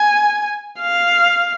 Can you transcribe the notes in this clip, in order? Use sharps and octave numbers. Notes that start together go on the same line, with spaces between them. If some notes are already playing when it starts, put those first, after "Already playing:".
Already playing: G#5
F5